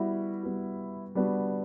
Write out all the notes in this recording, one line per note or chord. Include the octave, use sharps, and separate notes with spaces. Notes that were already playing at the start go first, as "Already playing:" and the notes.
Already playing: G3 B3 E4 F#4
G3 B3 F#4
G3 B3 D4 F#4